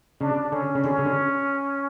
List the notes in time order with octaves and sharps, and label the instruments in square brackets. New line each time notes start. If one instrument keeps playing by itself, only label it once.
[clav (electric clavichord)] C#3 [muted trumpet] D4
[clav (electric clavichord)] D3 [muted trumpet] C#4
[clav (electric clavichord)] C#3
[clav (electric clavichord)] D3 [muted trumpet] C#4
[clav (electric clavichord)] C#3
D3